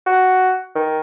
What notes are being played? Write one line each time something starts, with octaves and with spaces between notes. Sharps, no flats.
F#4
D#3